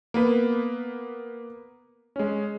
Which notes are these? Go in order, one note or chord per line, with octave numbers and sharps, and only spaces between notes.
A#3 B3 B4
G#3 C#4